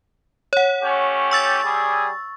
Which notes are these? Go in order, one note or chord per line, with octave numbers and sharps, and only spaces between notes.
C#5 F#5
A3 C#4 G4
C#6 E6 A6
G3 G#4